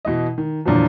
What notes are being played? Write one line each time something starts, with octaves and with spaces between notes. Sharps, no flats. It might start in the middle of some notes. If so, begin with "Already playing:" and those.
B2 E3 D#5
D#3
E2 G2 A#2 D3 F3 F#3